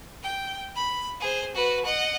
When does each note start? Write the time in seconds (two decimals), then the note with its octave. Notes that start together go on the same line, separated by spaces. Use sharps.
0.23 G5
0.75 B5
1.20 G#4 C5
1.55 F#4 B4
1.85 D#5 F#5